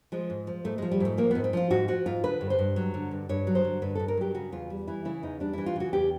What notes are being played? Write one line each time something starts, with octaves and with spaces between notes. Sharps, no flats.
F3 G#3
G#2
F3
G#2 A3
F3 G#3
G3
G#2 A3
F3 A#3
G#2 B3
C4
F3 F4
G#2 F#4
F3 F#4
G#2 F4
D3 B4
G2
C5
G2
F#3
D3
G2
G2 C#5
F#3
C5
D3
G2 B4
G2 A4
A#4
F#3 G4
C#3 F#4
E2 F4
G3
E3 E4
C#3 E4
E2 D#4
G3 D4
E3 E4
F4
C#3 F#4
E2 G4